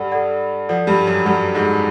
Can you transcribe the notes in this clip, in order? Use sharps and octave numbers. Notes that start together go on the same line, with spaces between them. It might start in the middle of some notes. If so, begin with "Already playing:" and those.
Already playing: G2 G3 A4 D5 F#5
A4 D5 F#5
F3 A4 D5 F#5
G2 G3
F#2 F#3
G2 G3 A4 D5 F#5
G#2 G#3